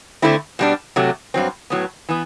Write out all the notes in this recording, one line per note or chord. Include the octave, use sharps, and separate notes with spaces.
D3 A3 C4 E4
B2 G3 D4
C3 F#3 A3
G2 F#3 C4
A2 F#3 B3
E3 B3